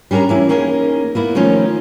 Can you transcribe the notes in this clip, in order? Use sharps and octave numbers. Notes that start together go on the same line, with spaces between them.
G3 C#4 D4 A#4 A#5
E3 C#4 E4
A#3 C#4 D#4 G#4 A#4
A#3 B3 E4
D#3 F3 A3 C#4 D#4